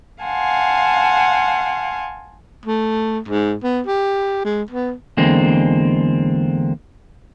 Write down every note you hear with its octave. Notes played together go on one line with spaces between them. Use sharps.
F5 F#5 G#5 A5 C6
A3
G#2
B3
G4
G#3
B3
E2 D3 G#3 A#3 C4